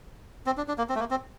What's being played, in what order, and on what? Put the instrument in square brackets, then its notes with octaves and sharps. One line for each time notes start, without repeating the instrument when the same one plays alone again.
[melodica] C4
D4
D4
A#3
C4
A3
A#3
C4